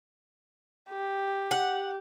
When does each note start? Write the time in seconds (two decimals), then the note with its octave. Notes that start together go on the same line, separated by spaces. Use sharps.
0.90 G4
1.51 F#5